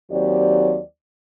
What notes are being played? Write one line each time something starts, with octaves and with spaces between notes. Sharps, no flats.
D#2 F#3 C4 G4 D5